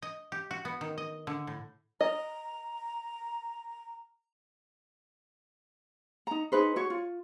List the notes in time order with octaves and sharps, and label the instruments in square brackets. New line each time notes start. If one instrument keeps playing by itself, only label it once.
[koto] D#5
G4
F#4
B3
D#3
D#5
D3
A2
[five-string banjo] D#5 [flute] A#5
[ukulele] D#4 A#5
D#4 G#4 B4 C5
F#4 C#5
F4